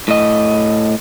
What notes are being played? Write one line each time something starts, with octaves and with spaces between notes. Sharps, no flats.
A2 D#5